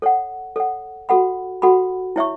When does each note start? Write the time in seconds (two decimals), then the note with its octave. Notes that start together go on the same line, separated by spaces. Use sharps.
0.02 A4 C#5 F#5
0.56 A4 C#5 F#5
1.09 F#4 A4 F#5 B5
1.62 F#4 A4 F#5 B5
2.16 E4 C#5 E5 C#6